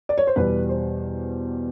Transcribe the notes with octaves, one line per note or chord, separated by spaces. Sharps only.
D5
C#5
C5
E2 B2 G3 B4
C5